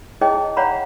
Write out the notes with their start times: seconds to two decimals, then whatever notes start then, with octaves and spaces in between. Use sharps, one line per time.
0.21 D#4 E4 G#4 C#5 D#5 G5
0.57 C#5 D5 F5 F#5 A#5 B5